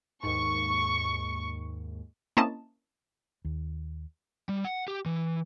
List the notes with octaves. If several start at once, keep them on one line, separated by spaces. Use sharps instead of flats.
D#2 G#2 C#6
A#3 C4 C#4 E4 D#5 A5
D#2
G3
F#5
G4
E3